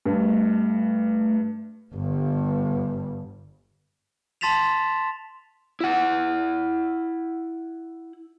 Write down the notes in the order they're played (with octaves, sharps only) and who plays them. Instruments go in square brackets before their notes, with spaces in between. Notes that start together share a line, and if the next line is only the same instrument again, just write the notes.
[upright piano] G2 [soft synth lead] A3
[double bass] G1 G2
[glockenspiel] A5 C6 A6 B6 E7 F7
[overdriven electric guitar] E4 F#5